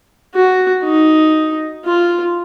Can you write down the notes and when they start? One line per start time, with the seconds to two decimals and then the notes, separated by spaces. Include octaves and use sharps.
0.34 F#4
0.84 D#4
1.85 F4